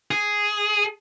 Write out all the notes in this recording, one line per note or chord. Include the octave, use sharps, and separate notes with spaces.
G#4